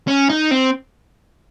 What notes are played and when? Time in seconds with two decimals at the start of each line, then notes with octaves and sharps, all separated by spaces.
0.08 C#4
0.30 D#4
0.51 C4